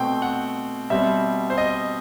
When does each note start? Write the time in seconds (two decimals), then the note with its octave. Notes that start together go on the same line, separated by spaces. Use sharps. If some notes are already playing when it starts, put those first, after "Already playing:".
Already playing: B2 A3 C4 G5
0.22 F#5
0.90 B2 G3 C4 E5
1.50 C5
1.58 D#5